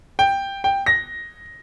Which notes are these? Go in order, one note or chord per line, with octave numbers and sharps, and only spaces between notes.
G5
G5
A#6